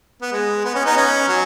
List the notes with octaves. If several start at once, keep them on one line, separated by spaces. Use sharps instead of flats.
B3
G#3
B3
C#4
B3 D#4
C#4
F#3